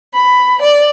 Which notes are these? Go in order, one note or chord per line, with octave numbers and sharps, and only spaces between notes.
B5
D5